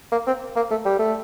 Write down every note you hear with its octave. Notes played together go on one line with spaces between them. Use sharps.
A#3
C4
A#3
A3
G3
A3